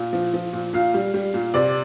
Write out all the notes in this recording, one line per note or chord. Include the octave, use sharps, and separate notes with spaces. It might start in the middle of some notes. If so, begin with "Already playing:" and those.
Already playing: A#2
F3
F3
A#2
A#2 F5
G3
G3
A#2
C3 D5